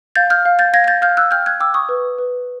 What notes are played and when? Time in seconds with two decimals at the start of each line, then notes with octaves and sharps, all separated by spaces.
0.15 F5 G6 A6
0.30 F6 G6
0.45 F5
0.59 G6 A6
0.73 F5 G#6 A#6
0.84 G#6
0.88 G6 A6
1.02 F5 F6 G6
1.17 E6 F#6
1.31 G5 F6 G6
1.46 F#6 G#6
1.60 G5 D6 E6
1.74 C#6 D#6
1.89 B4
2.18 B4